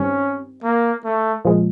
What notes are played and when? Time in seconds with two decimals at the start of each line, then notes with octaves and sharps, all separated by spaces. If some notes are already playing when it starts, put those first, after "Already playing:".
Already playing: G2 D#3 G3 C4 C#4
0.63 A#3
1.04 A3
1.45 A#2 F3 G#3